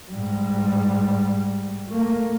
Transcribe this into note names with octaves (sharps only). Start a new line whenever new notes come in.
G#2 G3
A3 A#3